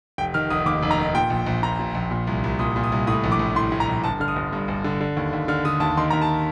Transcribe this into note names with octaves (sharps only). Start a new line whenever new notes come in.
F1 G5
D#3 F6
F1 D#6
D#2 D6
F1
A#5
D#3
A#2 G5
A#1
A#1
A#2 A#5
A#2
A#1
A#2
C2
C2
A#2 D#6
A#2
D#6
C2
A2 D#6
A#1
D6
A#1
A2 C6
A2
A#5
A#1
G1 A5
D3 F6
D#6
G1
G2
G1
D3
D3
D#2
D#2
D3 F6
D3 D#6
D#2 A5
D#3 C6
D#2 A#5
A5